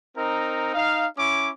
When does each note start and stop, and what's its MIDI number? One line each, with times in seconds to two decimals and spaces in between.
0.16 0.71 60
0.16 0.71 63
0.16 0.71 70
0.74 1.06 63
0.74 1.06 77
1.17 1.50 61
1.17 1.50 64
1.17 1.50 86